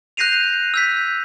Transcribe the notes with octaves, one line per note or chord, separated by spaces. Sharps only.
F#6 G6 A#6 C7 D#7 F7
E6 G6 B6